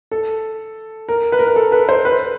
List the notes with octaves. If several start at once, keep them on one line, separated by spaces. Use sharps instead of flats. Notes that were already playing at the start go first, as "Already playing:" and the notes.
A4
A#4
B4
A#4
B4
A4
B4
C5
B4